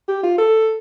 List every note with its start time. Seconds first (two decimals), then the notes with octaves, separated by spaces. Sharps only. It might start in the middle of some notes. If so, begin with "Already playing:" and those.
0.08 G4
0.23 F4
0.38 A4